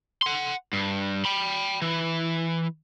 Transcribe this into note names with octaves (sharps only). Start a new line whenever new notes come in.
F#5 C6
G2
G5 B5
E3